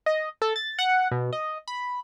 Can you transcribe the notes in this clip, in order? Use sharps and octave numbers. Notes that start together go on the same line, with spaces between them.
D#5
A4
A6
F#5
B2
D#5
B5